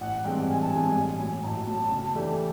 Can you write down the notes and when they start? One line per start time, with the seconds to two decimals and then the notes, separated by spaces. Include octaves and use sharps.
0.01 A1 F#5
0.24 G2 E3 G#3 C4 G5
0.48 A1 G#5
0.62 A5
0.72 G2 E3 G#3 C4 G#5
0.96 A1
1.20 A2 F#3
1.43 A1 A5 A#5
1.67 A2 F#3
1.91 C#3
2.15 E3 A3 D4 G4